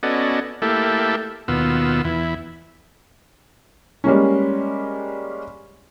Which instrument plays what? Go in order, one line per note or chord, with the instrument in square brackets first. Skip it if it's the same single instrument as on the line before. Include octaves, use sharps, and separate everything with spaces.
[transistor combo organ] B3 C#4 F#4 A4 D5 D#5
A3 A#3 E4 G4 A4
D#2 B2 B3 F4 E6
E2 E4
[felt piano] G3 G#3 A#3 C#4